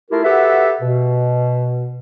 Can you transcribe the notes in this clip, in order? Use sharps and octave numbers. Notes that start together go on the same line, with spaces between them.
A3 E4 F4 G4 A#4
F#4 G4 A4 B4 E5 F#5
B2